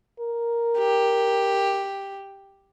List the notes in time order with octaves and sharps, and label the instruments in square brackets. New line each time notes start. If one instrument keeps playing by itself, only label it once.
[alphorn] A#4
[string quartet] G4